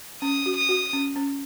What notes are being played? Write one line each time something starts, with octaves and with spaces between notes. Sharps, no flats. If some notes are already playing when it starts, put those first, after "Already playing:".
C#4 D#6
F#4
D#6
F#4
C#4
C#4